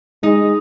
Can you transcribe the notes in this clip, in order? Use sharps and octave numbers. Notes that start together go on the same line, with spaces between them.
G#3 D#4